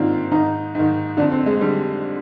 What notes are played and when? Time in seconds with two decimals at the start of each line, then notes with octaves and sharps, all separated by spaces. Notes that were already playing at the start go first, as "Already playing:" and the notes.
Already playing: G#2 D#3 A#3 C4 D4 F4
0.31 G#2 D#3 D#4
0.75 G#2 D#3
1.17 F2 D3 D4
1.32 C4
1.46 G#3
1.61 D3 G3